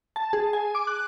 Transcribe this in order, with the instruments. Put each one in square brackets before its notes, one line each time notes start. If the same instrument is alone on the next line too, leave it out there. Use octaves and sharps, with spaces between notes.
[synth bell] A5
G#4
G#5
D6
F#6